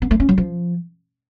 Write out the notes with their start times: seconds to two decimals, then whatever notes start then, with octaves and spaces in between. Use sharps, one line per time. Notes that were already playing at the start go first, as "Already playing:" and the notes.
0.02 B3
0.11 A3
0.20 C#4
0.29 F#3
0.38 F3